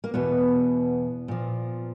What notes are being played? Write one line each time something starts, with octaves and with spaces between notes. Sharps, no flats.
A#3
E2 B2 B3
A#2 F3